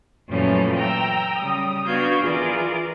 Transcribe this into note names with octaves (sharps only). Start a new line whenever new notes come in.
F#2 A#2 E3 F3 A3 C#4
G5 A#5 E6
C#3 G3 D#6
B3 D4 F#4 F5 G6 G#6
E3 F4 G#4 A#4 D5